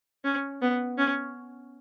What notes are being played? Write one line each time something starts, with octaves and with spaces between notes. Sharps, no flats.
C#4
B3
C#4